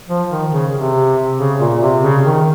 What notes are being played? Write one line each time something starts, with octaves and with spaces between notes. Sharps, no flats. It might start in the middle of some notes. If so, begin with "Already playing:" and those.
F3
D#3
C#3
C3
C#3
A#2
C3
C#3
D#3